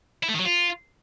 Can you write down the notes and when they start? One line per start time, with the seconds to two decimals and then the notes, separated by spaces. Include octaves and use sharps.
0.23 E4
0.29 A3
0.34 D#3
0.40 F#3
0.45 F4